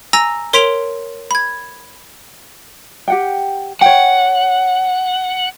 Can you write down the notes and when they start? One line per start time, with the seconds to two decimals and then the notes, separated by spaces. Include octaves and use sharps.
0.13 G#5 A#5 E6 A#6
0.53 A#4 C#5 C6 B6 D7 F7
1.31 B5 G#6
3.08 G4 F#5 G5
3.81 C#5 F#5 G5